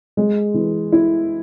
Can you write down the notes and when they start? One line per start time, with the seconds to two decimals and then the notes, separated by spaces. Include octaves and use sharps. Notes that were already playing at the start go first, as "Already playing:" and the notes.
0.17 G#3
0.54 E3
0.92 E4